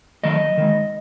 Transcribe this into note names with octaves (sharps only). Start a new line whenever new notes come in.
D#3 F#3 A3 D#5
D#3 G#3